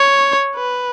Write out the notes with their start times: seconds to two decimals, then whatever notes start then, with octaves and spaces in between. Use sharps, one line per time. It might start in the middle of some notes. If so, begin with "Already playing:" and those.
Already playing: C#5
0.56 B4